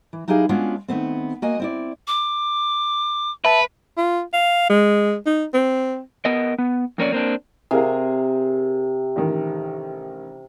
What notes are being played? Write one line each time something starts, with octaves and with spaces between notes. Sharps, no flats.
E3
F#3 D#4 E4 G4 G#4 F5
G#3 B3 C#4 D4 F4 F#4
D#3 A3 B3 C4
A#3 F#4 D#5 G#5
C4 E4 D5
D6
B4 E5 A5
F4
F5
G#3
D#4
C4
B3 A#4 D#5
B3
F2 A#3 C#4 D5
A#3 C4 D4
C3 G#4 A#4 F5
A1 D#3